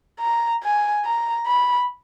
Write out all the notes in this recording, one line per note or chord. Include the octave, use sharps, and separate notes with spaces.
A#5
G#5
A#5
B5